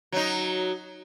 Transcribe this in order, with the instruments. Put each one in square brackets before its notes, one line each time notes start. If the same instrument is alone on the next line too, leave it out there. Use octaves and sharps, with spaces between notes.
[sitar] F#3 D#4